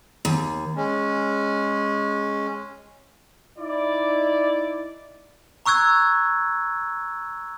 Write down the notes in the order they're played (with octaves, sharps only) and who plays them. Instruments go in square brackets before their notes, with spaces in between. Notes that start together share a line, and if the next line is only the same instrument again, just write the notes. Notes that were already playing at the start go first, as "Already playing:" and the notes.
[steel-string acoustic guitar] D#2
[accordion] G#3 C#4
[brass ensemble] D#4 E4 D5
[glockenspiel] A#5 C#6 E6 F#6 G#6